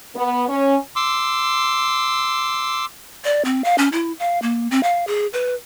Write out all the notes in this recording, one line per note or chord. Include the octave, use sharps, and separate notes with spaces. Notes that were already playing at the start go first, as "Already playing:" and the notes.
B3
C#4
C6 D6 E6
D5
C4
F5
C#4
E4
F5
A#3
C4
F5
G#4
B4